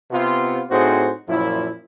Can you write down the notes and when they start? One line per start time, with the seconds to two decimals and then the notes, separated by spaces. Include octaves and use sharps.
0.11 C3 B3 F4
0.70 A2 C4 D#4 F#4 G#4 C5
1.27 F#2 A#2 F3 E4